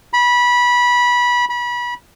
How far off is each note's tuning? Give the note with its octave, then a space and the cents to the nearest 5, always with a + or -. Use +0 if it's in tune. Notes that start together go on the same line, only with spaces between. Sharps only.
B5 -20
B5 -30